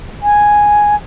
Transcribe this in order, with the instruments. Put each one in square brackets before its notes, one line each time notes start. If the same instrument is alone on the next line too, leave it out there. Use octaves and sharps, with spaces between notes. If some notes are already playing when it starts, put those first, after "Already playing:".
[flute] G#5